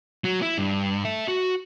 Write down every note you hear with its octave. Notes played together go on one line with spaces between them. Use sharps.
F#3
E4
G2
E5 A5
F#4